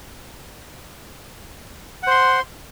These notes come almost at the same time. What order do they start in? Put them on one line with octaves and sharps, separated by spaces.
F#5 C5 C6